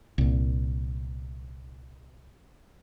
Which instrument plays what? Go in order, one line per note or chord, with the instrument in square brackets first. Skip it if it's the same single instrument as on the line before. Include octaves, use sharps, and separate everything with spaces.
[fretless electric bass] C2 A#2